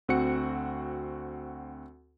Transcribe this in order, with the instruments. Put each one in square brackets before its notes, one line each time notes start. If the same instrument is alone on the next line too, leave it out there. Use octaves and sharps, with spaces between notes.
[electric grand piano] D2 C4 F#4 F#5 C#7